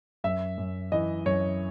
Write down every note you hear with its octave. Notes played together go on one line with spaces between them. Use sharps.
F#2 E5
F#2
E3 D#5
F#2 C#5